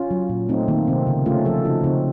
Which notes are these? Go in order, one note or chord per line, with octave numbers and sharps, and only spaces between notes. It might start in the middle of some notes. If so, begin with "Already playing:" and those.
Already playing: C#4 F4
F#3
A#2
A3 C4 D#4
D#3 A#3
C3 C4
C#3
A3 C#4 F4
F3 F4 A4
C#3 D#4 F#4
C#3 C4 D#4